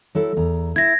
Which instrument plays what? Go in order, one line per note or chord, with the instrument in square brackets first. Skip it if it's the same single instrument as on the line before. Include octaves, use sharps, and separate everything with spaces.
[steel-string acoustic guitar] F#3 E4 A4
E2 A#5
[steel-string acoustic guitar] E4 E5 [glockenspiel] G#6 A#6